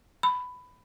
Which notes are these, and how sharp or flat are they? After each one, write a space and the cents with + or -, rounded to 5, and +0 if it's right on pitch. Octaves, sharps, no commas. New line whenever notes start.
B5 +15